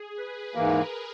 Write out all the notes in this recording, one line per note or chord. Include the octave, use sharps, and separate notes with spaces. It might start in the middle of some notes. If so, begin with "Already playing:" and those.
Already playing: G#4
B4
G#2 E3 A#3 A#4